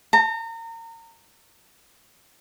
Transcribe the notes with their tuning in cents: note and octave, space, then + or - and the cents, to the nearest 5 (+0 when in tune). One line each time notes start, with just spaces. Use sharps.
A#5 -35